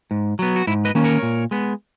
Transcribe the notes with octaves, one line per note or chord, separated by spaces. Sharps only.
G#2
F#3 B3
F#4
G#2 E4
B4 D#5
D#3 A#3 C#4
A#4 C#5
A#2
G#3 B3